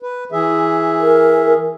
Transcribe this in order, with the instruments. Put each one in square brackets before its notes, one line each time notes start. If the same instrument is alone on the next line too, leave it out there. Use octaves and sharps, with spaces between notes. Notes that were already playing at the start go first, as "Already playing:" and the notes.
[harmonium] B4
E3 G#4 E5
[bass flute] A#4